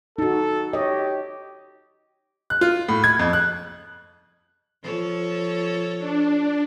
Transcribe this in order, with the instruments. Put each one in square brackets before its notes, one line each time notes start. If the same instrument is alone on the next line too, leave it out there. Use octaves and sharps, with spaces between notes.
[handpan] D#4 F#4 [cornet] A4
[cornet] G4 [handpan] C#5 D#5
[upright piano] F#6
F4
A2
G#6
F2
F#6
[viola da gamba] F3 A4 C#5
[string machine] D4